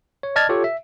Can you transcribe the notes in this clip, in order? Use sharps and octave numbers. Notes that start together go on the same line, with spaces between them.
C#5
D5 D#5 A5 F6 G#6 A6
F4 G4 A4 C#5
E5